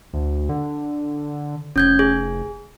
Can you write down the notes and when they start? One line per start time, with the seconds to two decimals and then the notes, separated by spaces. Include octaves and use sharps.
0.13 D2
0.49 D3
1.76 F1 C#4 G6 G#6
1.99 G#4